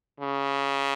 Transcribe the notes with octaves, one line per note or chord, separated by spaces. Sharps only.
C#3